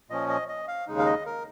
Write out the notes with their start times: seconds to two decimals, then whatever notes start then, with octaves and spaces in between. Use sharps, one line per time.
0.09 A#2 F3 C#4 D#5
0.29 D#5
0.48 D#5
0.68 F5
0.87 D#2 C#3 G#3 D#4
0.99 F5
1.06 D#5
1.26 A#4